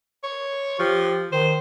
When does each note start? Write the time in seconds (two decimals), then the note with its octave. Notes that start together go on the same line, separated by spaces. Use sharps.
0.23 C#5
0.79 F3 G4
1.32 D#3 C5